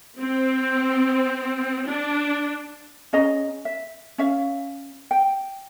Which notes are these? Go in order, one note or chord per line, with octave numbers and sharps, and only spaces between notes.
C4
D4
C#4 G#4 D#5 A#5
E5
C#4 E5 F5
G5